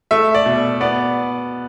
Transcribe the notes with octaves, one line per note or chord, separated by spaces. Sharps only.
A3 E5
D5
B2
B3 D5